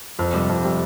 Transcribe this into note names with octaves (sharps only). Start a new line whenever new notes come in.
F2
C3 G3
F2
C3 G3